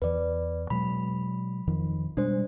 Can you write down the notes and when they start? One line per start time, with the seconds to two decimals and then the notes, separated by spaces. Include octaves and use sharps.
0.02 E2 E3 B4 D5
0.70 B2 F#3 G#3 B5
1.67 F2 D#3 F3
2.17 B2 G3 G#3 D4 C5